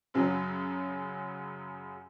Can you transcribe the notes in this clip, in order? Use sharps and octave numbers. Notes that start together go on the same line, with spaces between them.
F#2 C#3 F#3